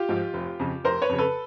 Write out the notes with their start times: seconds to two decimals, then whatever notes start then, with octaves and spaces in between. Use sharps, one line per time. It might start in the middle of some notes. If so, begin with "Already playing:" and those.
Already playing: F4 G4
0.09 G#2 F3
0.34 F1
0.60 F2 C#3
0.84 F1 A#4 C5
1.02 B4 C#5
1.09 F2 C#3
1.18 A4 B4